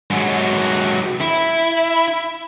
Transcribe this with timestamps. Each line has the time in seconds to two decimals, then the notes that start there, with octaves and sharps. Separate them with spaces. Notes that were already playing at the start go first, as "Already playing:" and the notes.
0.10 G#2 F#3
1.21 E4